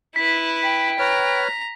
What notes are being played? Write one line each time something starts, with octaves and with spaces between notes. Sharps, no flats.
E4 B4 B6
G5
B4 C#5 A#5 F6